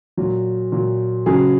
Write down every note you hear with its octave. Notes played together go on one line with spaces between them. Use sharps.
A#2 F#3
A#2 F#3
C#3 F#3 G#4